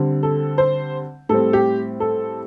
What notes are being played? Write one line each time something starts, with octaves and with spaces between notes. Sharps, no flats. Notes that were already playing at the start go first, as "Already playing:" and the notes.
Already playing: D3 G3 C4
A4
C5
A2 G3 C4 A4
G4
A4